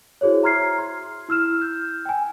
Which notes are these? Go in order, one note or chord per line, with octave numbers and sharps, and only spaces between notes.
E4 F#4 G#4 C5 C#5
E5 A#5 C6 F6 G#6 C7
C6
E4 E6 F6 E7
G6
G5 G#5